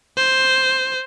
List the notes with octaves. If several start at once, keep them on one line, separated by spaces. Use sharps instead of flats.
C5